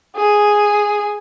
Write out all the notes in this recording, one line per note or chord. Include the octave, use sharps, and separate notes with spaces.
G#4